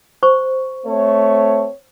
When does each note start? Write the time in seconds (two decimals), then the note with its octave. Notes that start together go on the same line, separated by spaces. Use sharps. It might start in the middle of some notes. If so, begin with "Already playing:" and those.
0.23 C5 C#6
0.86 A3 C4 C#5